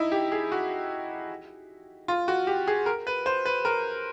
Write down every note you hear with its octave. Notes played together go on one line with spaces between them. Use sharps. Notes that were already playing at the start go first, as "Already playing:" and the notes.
Already playing: D#4 E4
G4
G#4
F#4
F4
F#4
G4
G#4
A#4
B4
C5
B4
A#4